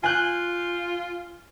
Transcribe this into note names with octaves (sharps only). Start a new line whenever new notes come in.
F4 G#5 F#6 G6